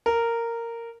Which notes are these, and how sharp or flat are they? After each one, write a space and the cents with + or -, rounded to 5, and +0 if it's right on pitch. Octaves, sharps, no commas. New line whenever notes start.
A#4 -10